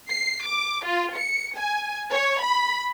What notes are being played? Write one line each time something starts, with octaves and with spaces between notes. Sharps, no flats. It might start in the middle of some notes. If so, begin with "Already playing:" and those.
C7
D6
F4
C#7
G#5
C#5
B5